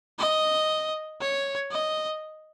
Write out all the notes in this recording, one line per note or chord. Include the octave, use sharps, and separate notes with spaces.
D#5
C#5
D#5